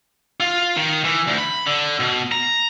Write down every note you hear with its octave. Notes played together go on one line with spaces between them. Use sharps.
F4
D#3
E3
D2
B5
D3
B2
A#5